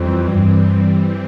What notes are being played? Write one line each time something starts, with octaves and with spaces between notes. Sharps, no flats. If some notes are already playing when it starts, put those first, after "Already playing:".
Already playing: F2 E3 G3 C4
G2